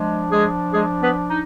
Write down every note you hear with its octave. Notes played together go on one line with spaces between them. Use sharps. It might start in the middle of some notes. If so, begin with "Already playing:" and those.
Already playing: F3 G#3 D4
G#3 G#4
G#3 G#4
B3 B4
D#4